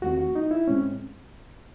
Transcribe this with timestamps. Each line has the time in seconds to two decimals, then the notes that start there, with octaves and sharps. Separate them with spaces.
0.01 E2 D#3 A3 C4 F#4
0.18 F#4
0.35 D#4
0.51 E4
0.68 A2 G#3 C4 C#4